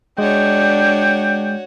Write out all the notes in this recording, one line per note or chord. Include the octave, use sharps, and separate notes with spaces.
G#3 D4 F#4 C#5 G5